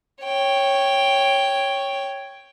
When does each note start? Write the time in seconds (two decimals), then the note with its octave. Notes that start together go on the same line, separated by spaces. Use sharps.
0.24 C#5 G5